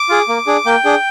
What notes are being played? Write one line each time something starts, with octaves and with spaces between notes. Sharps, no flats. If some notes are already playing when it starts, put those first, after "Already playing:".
Already playing: D6
F4 G#4
A#3
D4 G#4
A#3 G5
D4 G#4